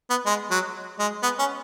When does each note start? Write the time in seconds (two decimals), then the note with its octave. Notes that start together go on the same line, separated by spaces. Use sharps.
0.10 B3
0.26 G#3
0.51 F#3
0.99 G#3
1.23 B3
1.39 C#4